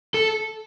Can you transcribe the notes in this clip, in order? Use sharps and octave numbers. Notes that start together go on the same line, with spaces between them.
A4